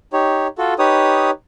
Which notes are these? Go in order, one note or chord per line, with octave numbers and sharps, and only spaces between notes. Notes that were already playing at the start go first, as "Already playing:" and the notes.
D#4 G4 C#5
F4 F#4 A4
D#4 G4 B4 C#5 D#6